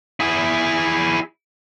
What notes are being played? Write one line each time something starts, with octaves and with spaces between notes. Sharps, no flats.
E4 G#4